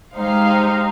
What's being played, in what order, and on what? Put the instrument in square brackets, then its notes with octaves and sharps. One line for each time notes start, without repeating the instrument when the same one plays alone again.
[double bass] G#3 [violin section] D#4 G4 C5 F5